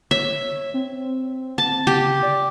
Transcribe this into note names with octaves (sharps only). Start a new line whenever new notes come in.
C#5 E5
C4
A5
C#3 G4
D5